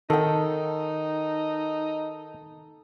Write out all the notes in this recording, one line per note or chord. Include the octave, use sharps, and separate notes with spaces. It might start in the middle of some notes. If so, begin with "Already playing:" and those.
D#3 D#4 A4 G5